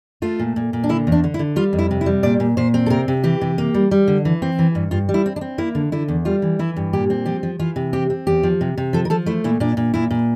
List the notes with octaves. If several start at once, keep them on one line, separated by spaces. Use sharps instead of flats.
A3 F4
A#2
A#2
A#2
D4
D3 E4
E2
D4
D3
E4
D3
G3 F4
F2
E4
C3
E4
G3
A#2 D5
A#2
A#2 C5
C4
A4
C3 A#4
C3
E3 G4
C3
A#3
G3
G3
D3
E3
C4
E3
G2
G2 F4
G3
E4
C4
D4
C4
A#3 E4
D3
D3 E4
E2
G3 F4
E3
E3 E4
G2
A#2 G4
C4
F3 G4
F3
E3 F4
C3
C4 G4
C4
E2 G4
F3
C3
C3
F3 A4
A#4
F3 A4
A3 E4
A#2 E4
A#2 D4
A#2
A#2 E4
A#2